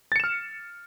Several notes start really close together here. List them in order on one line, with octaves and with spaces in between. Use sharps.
A6 C#7 E7 F6